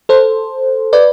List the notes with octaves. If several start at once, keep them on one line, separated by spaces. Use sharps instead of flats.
A4 C5
B4 D5